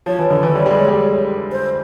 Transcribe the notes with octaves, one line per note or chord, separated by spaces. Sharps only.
F3 C#5
E3
D3 C#5
E3
G3
G3
G#3
G3
C5